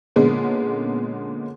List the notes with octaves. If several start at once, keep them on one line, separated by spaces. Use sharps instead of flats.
A#2 D3 G#3 A#3 B3 C#4